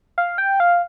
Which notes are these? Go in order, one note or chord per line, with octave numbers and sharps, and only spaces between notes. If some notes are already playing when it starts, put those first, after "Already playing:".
F5
G5
F5